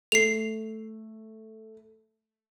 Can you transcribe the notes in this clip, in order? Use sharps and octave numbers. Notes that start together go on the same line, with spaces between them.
A3 C7 F7